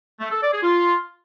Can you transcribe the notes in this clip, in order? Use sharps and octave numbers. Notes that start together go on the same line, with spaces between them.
A3
A4
D5
G#4
F4